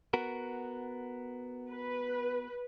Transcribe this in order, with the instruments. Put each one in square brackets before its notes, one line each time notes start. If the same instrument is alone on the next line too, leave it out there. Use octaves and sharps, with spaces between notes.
[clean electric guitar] B3 F#4 A#4
[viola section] B4